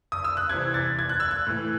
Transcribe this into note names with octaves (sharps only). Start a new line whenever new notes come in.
D#6
E6
F#6
C3 E3 G#6
A6
G#6
F#6
E6
F#6
A2 E3